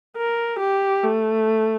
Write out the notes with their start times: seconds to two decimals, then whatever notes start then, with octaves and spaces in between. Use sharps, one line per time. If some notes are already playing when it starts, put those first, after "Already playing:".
0.17 A#4
0.60 G4
1.04 A3